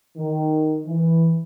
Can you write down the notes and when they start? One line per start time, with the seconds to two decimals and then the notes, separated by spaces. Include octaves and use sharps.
0.17 D#3
0.86 E3